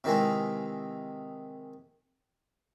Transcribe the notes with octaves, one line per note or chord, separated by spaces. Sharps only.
C3 D#3 E3 G#3